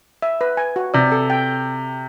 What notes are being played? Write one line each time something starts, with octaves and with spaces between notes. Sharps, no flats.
E5
B4
G#5
F#4
C3 D5
A4
G5